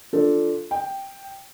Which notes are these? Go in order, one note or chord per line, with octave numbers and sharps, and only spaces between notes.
F3 D4 A4
G5